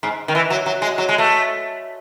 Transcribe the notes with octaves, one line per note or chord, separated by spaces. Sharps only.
G#2
D#3
E3
F#3
F#3
G#3
F#3
G#3
A3